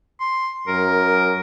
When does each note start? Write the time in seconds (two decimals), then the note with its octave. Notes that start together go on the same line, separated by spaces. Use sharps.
0.20 C6
0.67 F#2 A#4